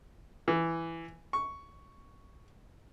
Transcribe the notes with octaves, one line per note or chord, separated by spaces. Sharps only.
E3
C#6